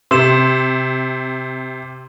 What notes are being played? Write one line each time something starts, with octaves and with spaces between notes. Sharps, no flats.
C3 C6 E7